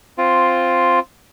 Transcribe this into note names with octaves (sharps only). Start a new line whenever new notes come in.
C4 F4